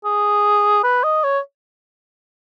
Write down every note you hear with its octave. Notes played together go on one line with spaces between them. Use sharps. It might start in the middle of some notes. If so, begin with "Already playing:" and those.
G#4
B4
D#5
C#5